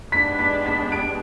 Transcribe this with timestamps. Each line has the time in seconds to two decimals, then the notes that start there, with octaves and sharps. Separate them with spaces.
0.12 G#3 B3 D4 G4 B6
0.39 B6
0.66 B6
0.92 D7